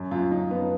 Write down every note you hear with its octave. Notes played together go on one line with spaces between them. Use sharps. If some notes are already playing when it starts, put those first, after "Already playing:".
Already playing: F#2
F#2 F4
F#2 D#4
F3 B3